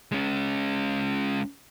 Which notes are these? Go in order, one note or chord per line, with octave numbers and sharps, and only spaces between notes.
G#3 C#4